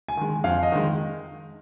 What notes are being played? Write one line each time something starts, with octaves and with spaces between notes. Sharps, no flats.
G#5
D#3 G#3
F2 F5
D#5
D#3 G#3